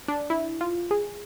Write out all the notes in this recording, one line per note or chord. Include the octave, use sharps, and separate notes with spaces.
D4
E4
F4
G#4